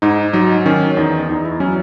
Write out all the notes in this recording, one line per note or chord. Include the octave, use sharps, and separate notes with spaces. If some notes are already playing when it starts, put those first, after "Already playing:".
G#2 D#4
F#3 D#4
D#3 C#4
E2 D#4
E2 D#4
E4
F#3 C#4